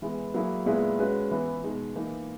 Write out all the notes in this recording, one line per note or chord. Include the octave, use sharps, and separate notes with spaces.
E3 G#3 B3 E4
F#3 A#3 E4 G#4
A#2 G#3 B3 E4 G#4
G#3 C#4 F#4 B4
E3 B3 E4
B2 G#3 D#4
E3 A#3 D#4